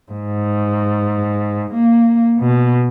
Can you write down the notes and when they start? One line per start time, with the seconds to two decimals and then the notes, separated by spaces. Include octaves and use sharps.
0.12 G#2
1.74 A#3
2.39 B2